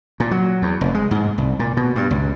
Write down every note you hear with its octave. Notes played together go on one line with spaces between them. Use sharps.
A#2
F#3
E2
F1
G#3
G#2
C2
A#2
B2
G2
C#2